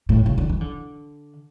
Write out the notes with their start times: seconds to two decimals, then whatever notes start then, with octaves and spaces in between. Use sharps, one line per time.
0.09 A2
0.26 C#3
0.38 D3
0.49 E3
0.61 D3